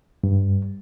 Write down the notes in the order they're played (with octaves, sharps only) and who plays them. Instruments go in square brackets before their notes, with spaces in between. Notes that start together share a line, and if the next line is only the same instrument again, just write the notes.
[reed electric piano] G2